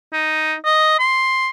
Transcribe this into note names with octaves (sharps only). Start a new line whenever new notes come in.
D#4
D#5
C6